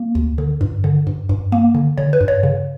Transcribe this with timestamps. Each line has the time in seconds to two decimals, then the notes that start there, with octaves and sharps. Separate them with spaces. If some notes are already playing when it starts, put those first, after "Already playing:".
Already playing: A#3
0.15 D2
0.38 D3
0.61 G2
0.84 D3
1.07 G2
1.29 G2
1.52 A#3
1.75 D3
1.98 D3 C#5
2.13 B4
2.21 G2
2.28 C#5
2.43 C#3